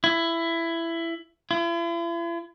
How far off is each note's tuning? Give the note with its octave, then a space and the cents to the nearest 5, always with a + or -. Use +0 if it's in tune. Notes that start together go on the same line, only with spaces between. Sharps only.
E4 +15
E4 +45